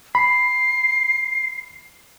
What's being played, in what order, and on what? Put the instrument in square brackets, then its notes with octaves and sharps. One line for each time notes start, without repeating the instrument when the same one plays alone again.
[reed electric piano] B5 [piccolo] C7